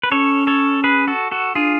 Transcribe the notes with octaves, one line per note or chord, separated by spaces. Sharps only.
B4
C#4 A4 C#5
A4 C#5
G#4 B4
F#4 A4
F#4 A4
D4 F4 G#4